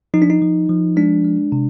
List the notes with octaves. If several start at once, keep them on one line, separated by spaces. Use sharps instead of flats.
F3 D#4
D4
D#4
F3
F3
G#3 D4
G#3
C3